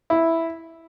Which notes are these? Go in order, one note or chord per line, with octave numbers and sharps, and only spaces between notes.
E4